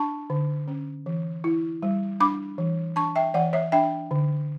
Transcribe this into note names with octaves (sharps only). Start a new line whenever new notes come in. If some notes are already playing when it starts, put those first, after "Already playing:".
Already playing: D4 A5 C#6
D3
C#4
E3
E4
G3
D4 B5 D6
E3
D4 A5 C#6
E5 G5
E3 D5 F#5
C#5 E5
D4 E5 G5
D3